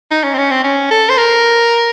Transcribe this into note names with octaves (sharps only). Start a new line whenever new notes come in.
D#4
C#4
C4
C#4
C4
C#4
A4
C5
A#4